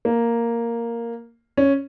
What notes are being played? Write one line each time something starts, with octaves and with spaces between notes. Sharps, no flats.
A#3
C#4